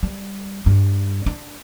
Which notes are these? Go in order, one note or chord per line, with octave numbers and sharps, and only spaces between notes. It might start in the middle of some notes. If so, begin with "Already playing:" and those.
G3
G2
D4